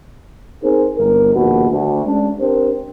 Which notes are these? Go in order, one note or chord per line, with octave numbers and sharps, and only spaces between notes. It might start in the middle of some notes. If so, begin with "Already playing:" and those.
C4 D#4 G#4 A#4 C5
G1 A#4
A#1 D#2 B2 F#4
D2
G#3 C#4 D4
C4 D4 G4 A#4 C5